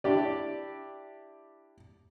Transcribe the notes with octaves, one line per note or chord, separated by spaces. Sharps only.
D4 E4 G4 D5